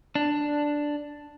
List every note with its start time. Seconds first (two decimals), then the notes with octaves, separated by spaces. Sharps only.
0.15 D4